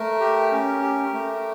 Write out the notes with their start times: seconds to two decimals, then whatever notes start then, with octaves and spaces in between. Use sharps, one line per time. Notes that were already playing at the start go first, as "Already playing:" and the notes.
Already playing: A3 A#4
0.20 G4
0.51 C#4
0.82 G4
1.13 A3